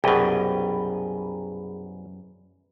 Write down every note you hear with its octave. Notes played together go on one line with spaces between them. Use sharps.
C2 F#2 B2 G#4 B4 G5